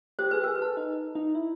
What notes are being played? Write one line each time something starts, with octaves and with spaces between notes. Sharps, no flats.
G4 C5
G#4 B4
G4
G#4 A#4
B4
A4
D#4
D#4
E4